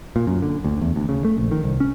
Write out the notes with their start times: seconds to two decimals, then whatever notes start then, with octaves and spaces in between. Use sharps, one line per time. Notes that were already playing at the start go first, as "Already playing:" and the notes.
0.16 A#2
0.27 F#2
0.42 D3
0.64 D2
0.81 E2
0.96 D2
1.09 C#3
1.25 A3
1.38 A#1
1.51 D#3
1.64 C2
1.80 C#4